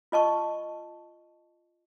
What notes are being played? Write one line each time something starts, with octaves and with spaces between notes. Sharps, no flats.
F4 D#5 A5 C#6